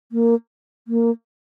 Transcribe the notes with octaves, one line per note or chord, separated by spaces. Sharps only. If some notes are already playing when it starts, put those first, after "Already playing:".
A#3
A#3